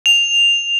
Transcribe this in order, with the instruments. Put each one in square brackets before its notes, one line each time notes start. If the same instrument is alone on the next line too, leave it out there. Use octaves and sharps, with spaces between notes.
[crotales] F7